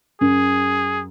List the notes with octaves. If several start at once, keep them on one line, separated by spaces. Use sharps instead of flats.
F#2 G#4